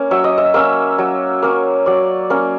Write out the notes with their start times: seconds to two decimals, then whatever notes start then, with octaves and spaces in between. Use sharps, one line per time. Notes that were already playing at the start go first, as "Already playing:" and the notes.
Already playing: A#3 C#4
0.11 F#3 E5
0.24 D#5
0.38 E5
0.54 A#3 C#4 E5
0.98 F#3
1.43 A#3 C#4
1.86 F#3 D5
2.30 A#3 C#4